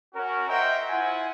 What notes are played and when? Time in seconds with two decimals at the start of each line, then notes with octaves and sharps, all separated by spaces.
0.15 C#4 F#4 A#4
0.48 C5 D#5 E5 F#5 G5 A#5
0.89 E4 F4 E5 F#5 G#5